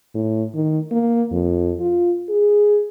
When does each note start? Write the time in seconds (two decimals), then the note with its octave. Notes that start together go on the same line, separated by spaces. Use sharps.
0.15 A2
0.55 D#3
0.92 A#3
1.32 F2
1.80 F4
2.29 G#4